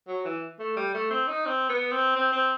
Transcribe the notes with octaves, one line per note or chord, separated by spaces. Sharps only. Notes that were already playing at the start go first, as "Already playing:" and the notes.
F#3
E3
A3
G3
A3
C4
D#4
C4
B3
C4
C4
C4